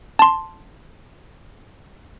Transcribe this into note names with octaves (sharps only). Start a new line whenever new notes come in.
A5 C6